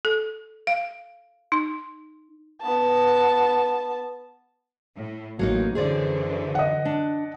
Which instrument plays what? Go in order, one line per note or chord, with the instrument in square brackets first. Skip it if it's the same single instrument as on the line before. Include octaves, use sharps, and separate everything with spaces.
[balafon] A4
F5
D#4
[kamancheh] B3 A5
[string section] A2
[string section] A1 [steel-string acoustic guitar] F#3 A#3 D#4
[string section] F#2 D3 E3 [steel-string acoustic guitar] G#4 C5 D5
[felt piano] D#5 F#5
[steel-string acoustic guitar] D4